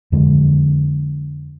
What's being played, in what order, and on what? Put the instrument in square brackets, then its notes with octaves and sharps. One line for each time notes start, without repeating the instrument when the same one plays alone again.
[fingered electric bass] F2 D3 G#3